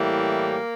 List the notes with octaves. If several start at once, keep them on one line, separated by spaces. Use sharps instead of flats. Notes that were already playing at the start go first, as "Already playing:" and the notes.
Already playing: A2 E3 G3 A#3